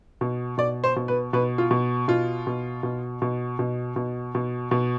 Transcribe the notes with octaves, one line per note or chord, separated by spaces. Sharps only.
B2
B2 D5
C5
B2
B4
B2 B4
F4
B2
B2 F4
B2
B2
B2
B2
B2
B2
B2